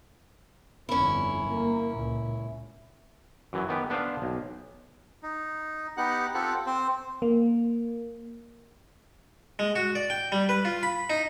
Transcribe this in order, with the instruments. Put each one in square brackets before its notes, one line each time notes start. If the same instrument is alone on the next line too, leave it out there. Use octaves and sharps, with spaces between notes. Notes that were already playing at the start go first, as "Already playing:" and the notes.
[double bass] G1 F2 [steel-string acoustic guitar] C#4 E4
[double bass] A#3
C#2 A#2
[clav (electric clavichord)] F#2 E3 F#3
D#3 B3 G4
B3 D4 B4 C5 F5
B1
[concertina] D#4
B3 D#4 G4 F#5
C4 F4 G4 A4 F#5
C4 C5
[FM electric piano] A#3
[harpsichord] G#3
F#4
D5
G5
G3
B4
F4
B5
D#4